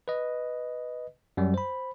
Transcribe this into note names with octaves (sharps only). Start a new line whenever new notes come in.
B4 D#5
F#2 F#3 G3
C5 B5